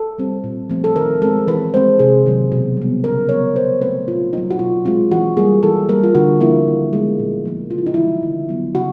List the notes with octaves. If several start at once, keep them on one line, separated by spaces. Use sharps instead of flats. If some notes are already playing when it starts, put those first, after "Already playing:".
Already playing: A4
G3 C4
A#2
F3 A3 C4
A4
D#3 A#4
G#3 C4 A4
E3 B4
G#3 C4 C5
C3 G#4
D#3 F#3 A#3
B2
G3 B3
C#3 A#4
F#3 B3 C#5
B2 C5
F#3 A3 C4 B4
A#2 F4
F#3 A#3 D#4
F#4
B2 F4
G#3 C4 F4
E3 F#4
G3 A#3 G#4
E3 A4
G3 A#3 A#4
F4
D3 F#4
F3 A#3 E4
D#3
G#3 B3
A#2
F3 A#3
C#3 F4
E4
D#4
E3 G3 E4
D3
F#3 B3
C#3 F#4